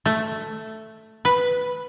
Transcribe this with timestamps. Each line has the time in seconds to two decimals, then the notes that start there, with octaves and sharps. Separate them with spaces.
0.06 A3
1.25 B4